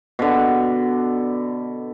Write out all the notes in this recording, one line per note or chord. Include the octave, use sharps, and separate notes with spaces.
B2 D3